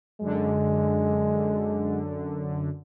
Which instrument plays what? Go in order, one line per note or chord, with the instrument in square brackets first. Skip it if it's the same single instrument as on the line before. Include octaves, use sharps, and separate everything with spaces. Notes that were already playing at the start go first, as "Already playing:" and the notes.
[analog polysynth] F#2 D3 [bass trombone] G#3